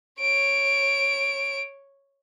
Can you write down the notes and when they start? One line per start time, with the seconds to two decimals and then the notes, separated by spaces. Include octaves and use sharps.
0.20 C#5 D7